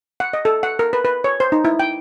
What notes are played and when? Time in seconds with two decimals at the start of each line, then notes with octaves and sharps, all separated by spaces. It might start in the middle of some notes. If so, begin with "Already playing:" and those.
0.20 F#5
0.33 D#5
0.45 A4
0.63 F#5
0.79 A#4
0.93 B4
1.05 B4
1.24 C#5
1.40 C5
1.52 D#4
1.65 E4
1.80 G5